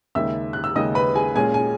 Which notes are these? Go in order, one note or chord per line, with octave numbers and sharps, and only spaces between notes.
D#2 C#3 G#3 D#4 E5 E6
F#6
E6
D#2 C#3 G#3 D#4 D#5 D#6
B4 B5
G#4 G#5
A#2 G#3 C#4 G#4 G#5
G#5